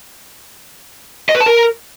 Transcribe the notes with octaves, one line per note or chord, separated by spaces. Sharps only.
D#5
B4
A5
A#4